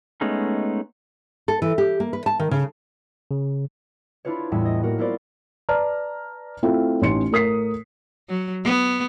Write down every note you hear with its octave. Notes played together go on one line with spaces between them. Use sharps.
G#3 A3 B3 C#4 D#4
A4
E3
G4
A#3
B4
A5
D#3
C#3
C#3
D4 E4 F4 B4 C#5
E2 A2 G3 E5 E6
D#5
A#3 F#4 A#4 D#5
B3 E4 F4 A#4 C5 D5
B4 D5 A5 A#5 F6
A3 C4 E4 F4
A1 C#4 D#4 C6 C#7
A2 A#4 D#6 B6 C7
F#3
B3